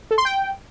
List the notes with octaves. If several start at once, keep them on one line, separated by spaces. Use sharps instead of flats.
A4
C6
G5